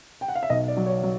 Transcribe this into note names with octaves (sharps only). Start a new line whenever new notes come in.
G5
F#5
F5
E5
B1 D#5
D5
F#3
C#5
F#3